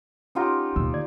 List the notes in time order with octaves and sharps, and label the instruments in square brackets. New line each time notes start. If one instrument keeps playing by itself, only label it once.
[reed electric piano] C#4 F#5 A#5 [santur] D#4 F4 G4
[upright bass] D#2 [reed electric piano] B2 E6
[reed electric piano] D2 D5 G#6